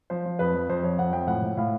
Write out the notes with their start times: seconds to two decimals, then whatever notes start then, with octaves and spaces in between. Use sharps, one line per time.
0.10 F3 C5
0.25 F3
0.39 F2 B4
0.54 F3
0.69 F2 C5
0.83 F3 C#5
0.99 F2 F#5
1.12 F3 G5
1.27 A2 F#5
1.42 A2
1.57 A2 F5